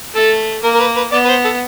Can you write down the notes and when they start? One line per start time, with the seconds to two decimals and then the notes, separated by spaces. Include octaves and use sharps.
0.15 A3 A4
0.63 A#3 A#4
0.74 A#4
0.80 B4
0.96 B4
1.12 B3 D5
1.25 B4
1.29 C5
1.44 A4